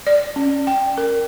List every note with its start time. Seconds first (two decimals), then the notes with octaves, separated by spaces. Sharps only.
0.07 D5
0.36 C#4
0.67 G5
0.98 A#4